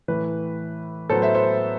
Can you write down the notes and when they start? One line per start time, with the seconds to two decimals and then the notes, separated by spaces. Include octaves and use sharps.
0.08 A2 E3 A3 B4
1.10 A2 F#3 B3 A4 C5
1.22 C5 E5
1.35 C5 E5